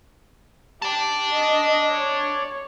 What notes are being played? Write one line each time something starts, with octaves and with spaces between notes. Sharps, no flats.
G4 D5 A5
D#5
C#5